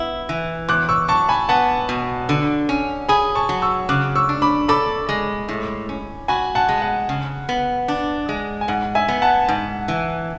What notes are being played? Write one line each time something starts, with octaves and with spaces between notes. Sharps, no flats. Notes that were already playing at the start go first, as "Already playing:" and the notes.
Already playing: B3 E4
E3
E2 D6 F#6
C#6 E6
F#3 A5 C#6
G#5 B5
B3 F#5 A5
B2
D3
C#4
G#4 G#5 B5
A5 C#6
F#3
C#6 E6
C#3 D6 F#6
C#6 E6
D4
B5 D6
A4 B5 D6
G#3
A2
C#4
F#4 G#5 B5
F#5 A5
G#3
F#5
C#3
B3
D4
G#3
G#5
G#2 F#5
E5 G#5
B3
F#5 A5
G#2
E3